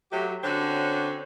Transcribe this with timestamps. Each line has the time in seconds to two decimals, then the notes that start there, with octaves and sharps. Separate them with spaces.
0.12 F#3 A3 G4
0.44 D3 C4 C#4 F#4 C#5